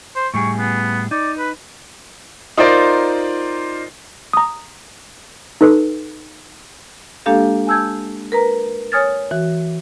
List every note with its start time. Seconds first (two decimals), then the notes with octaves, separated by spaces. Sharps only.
0.16 C5
0.34 A2 G3 G#4 C#6
0.58 B3
1.11 D#4 D5
1.38 B4
2.58 D#4 F4 A#4 C5 D5
4.33 A#5 D#6
5.61 D#4 A4 B4
7.26 G#3 A#3 D4 G4 A4 F5
7.67 G#5 A5 E6 G6 G#6
8.32 A#4 B4 A#5
8.92 C#5 G#5 D#6 F6 G#6 A6
9.31 E3 F#4